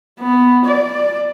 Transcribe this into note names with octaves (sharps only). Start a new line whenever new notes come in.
B3
D5